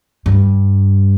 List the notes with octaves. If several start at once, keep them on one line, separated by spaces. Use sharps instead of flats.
G2